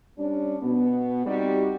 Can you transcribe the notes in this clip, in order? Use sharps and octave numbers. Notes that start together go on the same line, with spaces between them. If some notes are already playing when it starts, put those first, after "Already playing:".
G3 C#4 D4
B2 B3
G3 C4 D#4 F#4 G4